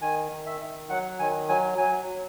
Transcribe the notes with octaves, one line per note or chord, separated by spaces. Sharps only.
D#3 G#5
D#3
E5
D#3
F#3 F#5
D#3 G#5
F#3 G#5
F#3 G#5
F#3